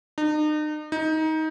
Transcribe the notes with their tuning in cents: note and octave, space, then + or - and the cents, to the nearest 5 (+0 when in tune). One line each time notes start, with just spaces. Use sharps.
D#4 -40
D#4 +20